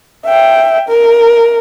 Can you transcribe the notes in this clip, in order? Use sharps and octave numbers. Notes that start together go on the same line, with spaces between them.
E5 G5
A#4